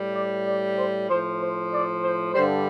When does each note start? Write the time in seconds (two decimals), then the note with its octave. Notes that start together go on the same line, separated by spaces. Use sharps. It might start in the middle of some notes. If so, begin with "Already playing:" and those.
Already playing: A2 G3
0.13 D5
0.45 D5
0.76 C5
1.08 A2 F3 C5
1.40 C5
1.71 D5
2.02 C5
2.34 G2 D3 G3 C5